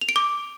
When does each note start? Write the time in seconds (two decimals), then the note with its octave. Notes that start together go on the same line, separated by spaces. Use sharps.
0.01 F7
0.09 D7
0.16 D6